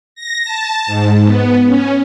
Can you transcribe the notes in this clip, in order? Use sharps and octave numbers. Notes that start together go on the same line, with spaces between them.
A#6
A5
G#2
B3
C#4